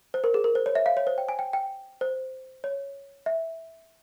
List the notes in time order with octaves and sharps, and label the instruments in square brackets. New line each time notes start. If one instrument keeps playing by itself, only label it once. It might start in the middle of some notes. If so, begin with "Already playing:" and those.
[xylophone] C5
A#4
G#4
A#4
C5
C#5
E5
F5
C#5
C5
G5
G#5
G5
G5
C5
C#5
E5